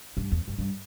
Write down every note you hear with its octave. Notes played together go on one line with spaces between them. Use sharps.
G2
E2
G2
G2